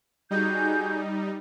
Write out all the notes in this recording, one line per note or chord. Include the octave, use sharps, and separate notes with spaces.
G3 D#4 F#4 G#4 G6